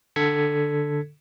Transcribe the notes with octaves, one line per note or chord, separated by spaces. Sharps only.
D3 A4 G#6 B6 C#7